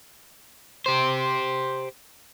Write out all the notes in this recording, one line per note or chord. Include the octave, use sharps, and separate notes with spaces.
G4 C5